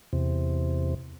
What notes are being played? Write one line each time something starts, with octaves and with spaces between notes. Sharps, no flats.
E2 C3